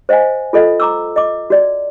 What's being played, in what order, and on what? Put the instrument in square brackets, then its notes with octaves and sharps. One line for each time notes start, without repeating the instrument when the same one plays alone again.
[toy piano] C5 D#5 F5 F#5 G#5
F4 A4 D#5 F5 F#5
A#5 D6 E6
D#5 D6
F#4 D5